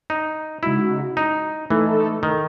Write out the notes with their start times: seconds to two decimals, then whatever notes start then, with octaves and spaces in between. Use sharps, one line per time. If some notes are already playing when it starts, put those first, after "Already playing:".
0.10 D#4
0.63 C#3 G#3 D#4 E4 F#4
1.17 D#4
1.70 E3 A3 D#4 A4
2.23 D#3